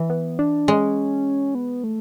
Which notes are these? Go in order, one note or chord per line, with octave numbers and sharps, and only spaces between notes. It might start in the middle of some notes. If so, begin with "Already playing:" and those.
Already playing: E3
B3
D4
G#3 C#4
B3
A3